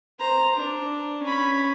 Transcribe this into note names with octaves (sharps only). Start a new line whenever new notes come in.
C5 A#5
D4
C#4 B5